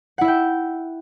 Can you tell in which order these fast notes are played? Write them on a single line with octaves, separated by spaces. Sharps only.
F#5 E4 E5 G5